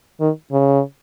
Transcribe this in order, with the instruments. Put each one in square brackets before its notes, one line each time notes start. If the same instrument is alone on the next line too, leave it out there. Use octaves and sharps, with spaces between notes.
[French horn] D#3
C#3